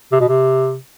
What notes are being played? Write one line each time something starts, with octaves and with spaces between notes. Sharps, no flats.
C3
B2
C3